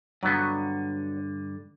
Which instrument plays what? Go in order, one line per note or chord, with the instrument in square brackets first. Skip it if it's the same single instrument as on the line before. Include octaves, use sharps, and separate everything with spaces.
[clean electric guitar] G2 D3 [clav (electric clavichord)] F#3 B3